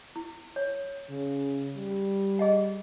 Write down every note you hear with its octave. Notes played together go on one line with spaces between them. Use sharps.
E4
C#5
C#3
G3
G#4 D#5 F#5